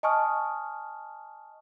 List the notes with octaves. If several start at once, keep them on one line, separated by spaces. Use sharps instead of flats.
D#5 G#5 A5 C#6 D#6 F6